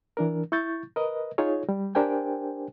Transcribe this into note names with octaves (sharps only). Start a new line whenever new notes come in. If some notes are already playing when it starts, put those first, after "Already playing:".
E3 D4 A#4
E4 C#6 G6 A6
A#4 B4 D#5
D#4 F4 G#4 C#5
G3
D4 G4 A#4 C5 G5 G#5